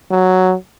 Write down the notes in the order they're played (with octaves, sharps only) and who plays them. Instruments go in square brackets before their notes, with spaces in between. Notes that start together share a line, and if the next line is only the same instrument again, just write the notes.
[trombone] F#3